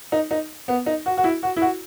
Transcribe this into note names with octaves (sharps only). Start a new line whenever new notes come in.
D#4
D#4
B3
D#4
F#4
F#4
E4
F#4
E4
F#4